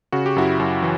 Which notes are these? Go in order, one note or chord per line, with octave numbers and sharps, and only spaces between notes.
C#3 F#4
G4
F#2 E4 F#4
F#2
E3